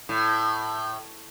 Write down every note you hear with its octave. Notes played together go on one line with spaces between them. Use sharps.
A2